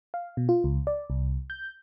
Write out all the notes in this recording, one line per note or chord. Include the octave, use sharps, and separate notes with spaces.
F5
B2
F4
C#2
D5
C2
G6